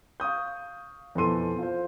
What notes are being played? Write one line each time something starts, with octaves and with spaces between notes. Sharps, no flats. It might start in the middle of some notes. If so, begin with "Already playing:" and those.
F5 C#6 D#6 G6
F2 B2 E3 A4 C6 D#7
F4 C5